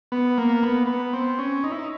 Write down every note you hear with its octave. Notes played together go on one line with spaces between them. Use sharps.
B3
A#3
B3
B3
C4
C#4
D#4
E4
D#4